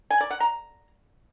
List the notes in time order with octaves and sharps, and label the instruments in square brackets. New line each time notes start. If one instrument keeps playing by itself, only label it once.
[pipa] G#5
D5
F#5
A#5